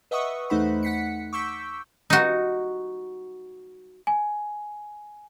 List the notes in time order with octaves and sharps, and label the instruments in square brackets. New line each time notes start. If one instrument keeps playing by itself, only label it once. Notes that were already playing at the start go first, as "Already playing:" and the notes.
[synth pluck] B4 D#5 E5 F#5 C#6 D#6
E2 A3 D#4 C5 F#5 B5
F#5 B6 C#7
C#6 D6 E6 G6 B6
[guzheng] D#4 F#4
[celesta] G#5